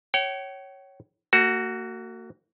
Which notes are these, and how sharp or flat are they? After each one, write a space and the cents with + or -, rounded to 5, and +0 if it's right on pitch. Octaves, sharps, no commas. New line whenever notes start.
C#5 -5 G5 -45
A#3 -40 F#4 +5